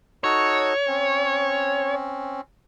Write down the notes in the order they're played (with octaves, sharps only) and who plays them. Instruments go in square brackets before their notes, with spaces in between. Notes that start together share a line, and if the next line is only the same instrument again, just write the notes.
[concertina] D#4 F#4 A4 [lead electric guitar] C#5
[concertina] C4 C#4